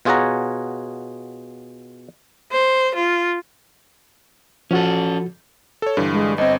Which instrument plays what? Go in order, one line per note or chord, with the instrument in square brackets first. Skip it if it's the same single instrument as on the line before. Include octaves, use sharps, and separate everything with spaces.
[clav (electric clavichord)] B2 F4 G#4 C#5 F#5 A#5
[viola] C5
F4
[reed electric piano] F3 F#4 [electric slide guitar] C#4 A4
[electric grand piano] A4 C#5
G2 D3 E3
[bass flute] G#3
[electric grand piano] G1 C4 [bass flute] D#5